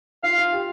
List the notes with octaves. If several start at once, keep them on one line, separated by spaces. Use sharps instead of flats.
F4 F5
F4
G4